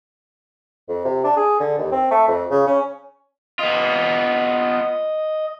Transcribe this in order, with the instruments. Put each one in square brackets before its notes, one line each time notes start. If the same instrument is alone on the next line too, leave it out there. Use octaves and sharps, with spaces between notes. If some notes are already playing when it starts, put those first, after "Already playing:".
[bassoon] F2
C3
D4
G#4
D3
D#2
C4
A3
F2
C#3
C#4
[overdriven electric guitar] B3 F4 [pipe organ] D#5